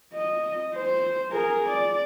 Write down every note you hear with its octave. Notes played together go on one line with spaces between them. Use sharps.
D#5
C5
G#4 A#4
D5